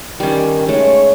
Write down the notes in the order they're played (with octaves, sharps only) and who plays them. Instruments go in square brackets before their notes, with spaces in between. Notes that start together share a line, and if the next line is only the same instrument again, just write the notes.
[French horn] D#3 [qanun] G3 C#4
[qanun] G#3 A3 [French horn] C#5